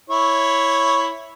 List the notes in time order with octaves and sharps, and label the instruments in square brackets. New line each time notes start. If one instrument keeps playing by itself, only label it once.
[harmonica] E4 C#5